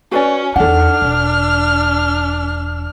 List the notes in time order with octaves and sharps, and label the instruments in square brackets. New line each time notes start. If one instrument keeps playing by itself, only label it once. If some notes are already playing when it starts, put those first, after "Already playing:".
[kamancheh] C#4 [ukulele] F#4 B4 D5
[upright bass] E2 D#4 [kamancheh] D4 F6 [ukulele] A4 F#5
[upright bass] E1